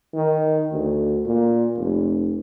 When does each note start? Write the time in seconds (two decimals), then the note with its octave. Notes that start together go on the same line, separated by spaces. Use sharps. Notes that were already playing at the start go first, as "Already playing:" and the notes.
0.14 D#3
0.72 D2
1.25 A#2
1.77 F1